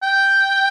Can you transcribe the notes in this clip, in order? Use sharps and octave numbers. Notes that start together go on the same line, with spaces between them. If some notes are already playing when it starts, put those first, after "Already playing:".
G5